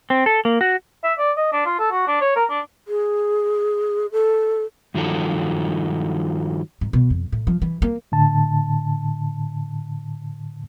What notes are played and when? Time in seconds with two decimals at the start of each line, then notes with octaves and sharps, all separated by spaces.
0.10 C4
0.26 A4
0.45 A#3
0.61 F#4
1.04 E5
1.18 D5
1.37 D#5
1.52 D4
1.66 F4
1.79 A4
1.91 F#4
2.07 D4
2.21 C#5
2.36 A#4
2.49 D4
2.88 G#4
4.12 A4
4.94 G2 D#3 F3 F#3 A4
6.81 G#2
6.93 B2
7.10 F2
7.32 A2
7.47 F3
7.62 E3
7.82 A#3
8.12 A2 D3 A5